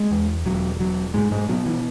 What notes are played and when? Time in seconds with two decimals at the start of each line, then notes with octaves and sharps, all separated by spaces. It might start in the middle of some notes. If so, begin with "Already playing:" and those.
Already playing: G#3
0.11 E2
0.46 E1 F#3
0.80 E1 F#3
1.14 B1 G#2 G#3
1.31 G#2 G#3
1.49 B2 F#3
1.66 E3